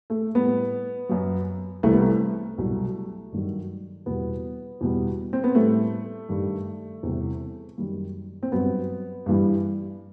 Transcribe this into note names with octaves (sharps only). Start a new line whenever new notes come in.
A3
A2 G3 B3
F#2 F#3
C2 C3 E3 G3 A3
B3
A3
C2 B2 F#3
G2 D#3 F#3
E2 B2 G3 B3
E2 B2 G3
C4
B3
A2 G3 A3
G2 D#3 G3
E2 C3 E3 G3
F#2 D#3 G3
C4
G2 F#3 B3
G2 E3 G3